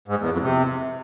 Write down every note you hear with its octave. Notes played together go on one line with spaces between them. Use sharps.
G#2
E2
F2
C3